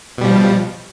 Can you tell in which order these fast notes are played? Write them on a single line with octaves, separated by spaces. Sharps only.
B2 G3 F3